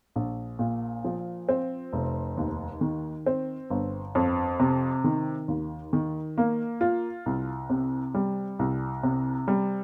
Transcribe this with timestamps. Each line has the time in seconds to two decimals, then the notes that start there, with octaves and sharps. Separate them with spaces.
0.16 A#1
0.59 A#2
1.05 F3
1.49 C4
1.93 F1
2.37 D#2
2.81 D#3
3.26 C4
3.70 G1
4.15 F2
4.60 C3
5.04 D#3
5.48 D#2
5.93 D#3
6.38 A#3
6.81 F4
7.26 C2
7.70 C3
8.14 G3
8.59 C2
9.03 C3
9.48 G3